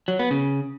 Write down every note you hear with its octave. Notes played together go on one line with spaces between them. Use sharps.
F#3
B3
C#3